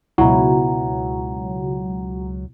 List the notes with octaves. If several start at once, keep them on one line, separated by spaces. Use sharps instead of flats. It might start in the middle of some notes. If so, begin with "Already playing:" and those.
C#2 B2 F#3 E4 F#5 A#5